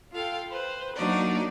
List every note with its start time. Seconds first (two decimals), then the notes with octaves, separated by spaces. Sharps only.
0.12 F4 A4 F5 G5
0.49 B4 C5
0.96 F#3 A#3 D4 D#4 F#4 D5